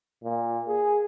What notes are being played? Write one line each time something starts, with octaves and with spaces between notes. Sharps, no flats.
A#2
G#4